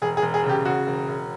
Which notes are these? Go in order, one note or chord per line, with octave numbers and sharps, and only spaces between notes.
E1 G#4
G#4
E1
G#4
C#3
G4
C#3 F#4
E1
E1